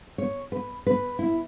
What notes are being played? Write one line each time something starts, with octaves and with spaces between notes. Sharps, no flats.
C#5
B4
B4
E4